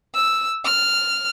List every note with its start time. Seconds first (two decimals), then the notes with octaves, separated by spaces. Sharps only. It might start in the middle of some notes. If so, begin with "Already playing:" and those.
0.15 E6
0.65 F6